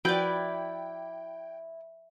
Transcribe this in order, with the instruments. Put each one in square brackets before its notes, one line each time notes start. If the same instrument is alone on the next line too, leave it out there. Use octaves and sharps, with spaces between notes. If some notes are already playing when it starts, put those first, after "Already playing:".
[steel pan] F3 F#4 [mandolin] E4 [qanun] B4 D5 [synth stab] G5